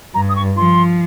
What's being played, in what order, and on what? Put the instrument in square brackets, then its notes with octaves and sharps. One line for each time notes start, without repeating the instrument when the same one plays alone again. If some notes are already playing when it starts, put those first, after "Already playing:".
[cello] G2 [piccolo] A#5
[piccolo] D#6
C#6
[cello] F3 [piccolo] C6